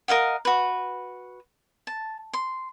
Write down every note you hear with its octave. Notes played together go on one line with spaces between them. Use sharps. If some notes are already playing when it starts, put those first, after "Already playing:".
A#4 D#5 F5 F#5
F#4 B4
A5
C6